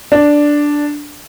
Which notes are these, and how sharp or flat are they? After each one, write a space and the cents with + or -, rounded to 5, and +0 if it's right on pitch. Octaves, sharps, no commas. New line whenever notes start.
D4 +0